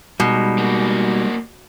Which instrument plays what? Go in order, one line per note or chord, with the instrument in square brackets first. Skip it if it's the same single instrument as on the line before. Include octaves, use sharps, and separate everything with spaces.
[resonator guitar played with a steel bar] B2 [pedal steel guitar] G3 G#3 D#4
[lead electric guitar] A#3 F#4